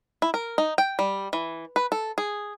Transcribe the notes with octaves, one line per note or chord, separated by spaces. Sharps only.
E4
A#4
D#4
G5
G3
E3
B4
A4
G#4